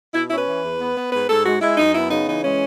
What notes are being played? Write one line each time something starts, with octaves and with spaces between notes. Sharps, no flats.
B2 E4
C#4 E4
B4
E3
E2
B3
B3
G#2 B4
G#2 A4
G#3 F#4
G#3 E4
F#2 D#4
B3 E4
C#3 D#4
E3 D#4
G#3 C#4